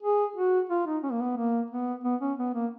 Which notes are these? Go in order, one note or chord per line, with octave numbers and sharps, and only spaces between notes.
G#4
F#4
F4
D#4
C#4
A#3
B3
A#3
B3
B3
C#4
B3
A#3